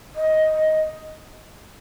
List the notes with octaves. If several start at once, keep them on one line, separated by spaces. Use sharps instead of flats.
D#5